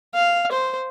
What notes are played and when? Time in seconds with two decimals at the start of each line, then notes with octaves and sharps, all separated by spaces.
0.15 F5
0.52 C5